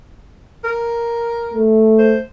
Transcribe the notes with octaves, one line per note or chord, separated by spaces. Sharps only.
A#4
A3
C5